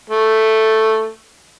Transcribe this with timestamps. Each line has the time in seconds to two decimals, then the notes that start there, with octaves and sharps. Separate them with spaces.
0.09 A3